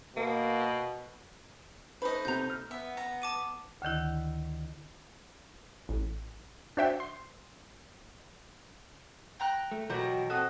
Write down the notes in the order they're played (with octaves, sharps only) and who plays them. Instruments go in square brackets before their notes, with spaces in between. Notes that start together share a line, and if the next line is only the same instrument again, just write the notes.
[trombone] B2 [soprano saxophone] A#3
[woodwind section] A3 D#4 C5 [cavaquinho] B4 D#5
[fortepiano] C3 B3 A#5 [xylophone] G6 F7
[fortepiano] F6
[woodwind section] B3 [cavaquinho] E5
[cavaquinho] A#5
[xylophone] A5 D6 D#7
[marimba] D2 D3 D#3 E4
[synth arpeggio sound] A1
D4 F#4 C5 E5 F#5 G5
C6
[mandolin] G5 A#5 F#6
[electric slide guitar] A3
[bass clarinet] B2 [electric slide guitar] E3 F#3 F#4 [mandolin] G4 A#4
[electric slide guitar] C4 A4 [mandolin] F#4 D#6